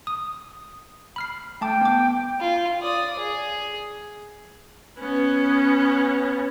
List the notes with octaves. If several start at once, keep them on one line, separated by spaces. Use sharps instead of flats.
D#6
B5 F6 C7
A3 G5 A5 D6
B3 D6
F4
D5 D#6
G#4
B3 C#4